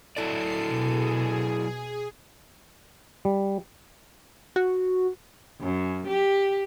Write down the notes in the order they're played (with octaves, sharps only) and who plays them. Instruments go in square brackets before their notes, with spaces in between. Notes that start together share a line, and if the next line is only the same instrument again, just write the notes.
[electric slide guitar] F#3 E4 D5 [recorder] A4 [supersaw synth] C7
[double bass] B2 [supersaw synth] G#4
[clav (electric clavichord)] G3
[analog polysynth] F#4
[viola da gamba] F#2
G4